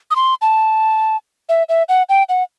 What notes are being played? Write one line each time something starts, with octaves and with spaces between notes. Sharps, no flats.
D#6
C6
A5
E5
E5
F#5
G5
F#5